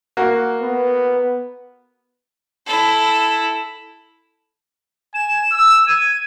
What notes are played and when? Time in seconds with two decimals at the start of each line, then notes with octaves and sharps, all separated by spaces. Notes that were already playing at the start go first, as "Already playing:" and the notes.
0.17 A#3 F#4
0.61 B3
2.67 E4 A4
5.14 G#5 E7
5.51 E6
5.87 G#6 D#7